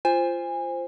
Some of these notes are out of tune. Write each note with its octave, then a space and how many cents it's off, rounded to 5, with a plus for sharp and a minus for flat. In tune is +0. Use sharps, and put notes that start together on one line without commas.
F4 -15 C5 +0 G#5 -25